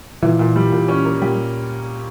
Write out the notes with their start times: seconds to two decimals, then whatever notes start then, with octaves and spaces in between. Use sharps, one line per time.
0.23 A#2 E3
0.39 A#2
0.56 G3
0.72 A#2
0.88 C#4
1.05 A#3
1.22 A#2 G3